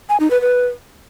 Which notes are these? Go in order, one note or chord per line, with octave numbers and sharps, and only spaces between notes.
G#5
D#4
B4
B4